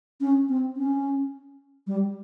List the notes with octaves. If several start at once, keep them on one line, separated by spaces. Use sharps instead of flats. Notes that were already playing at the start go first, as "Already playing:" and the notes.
C#4
C4
C#4
G3